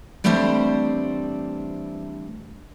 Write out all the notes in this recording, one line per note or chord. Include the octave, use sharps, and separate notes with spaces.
E3 G3 A3 C4 D4 C5